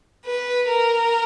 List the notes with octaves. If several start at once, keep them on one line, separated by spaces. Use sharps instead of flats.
B4
A#4